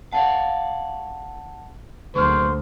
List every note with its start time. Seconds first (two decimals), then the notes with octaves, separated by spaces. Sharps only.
0.13 C#5 D5 F5 F#5 A5
2.15 D2 F#3 A#3 B3 C5 C#6 F6